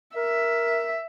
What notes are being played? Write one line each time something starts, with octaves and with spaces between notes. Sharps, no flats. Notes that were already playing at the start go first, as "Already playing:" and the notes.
A#4 E5